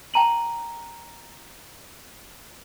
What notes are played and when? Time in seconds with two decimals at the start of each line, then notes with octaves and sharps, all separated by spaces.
0.14 G5 A5 A#5 D#7 F#7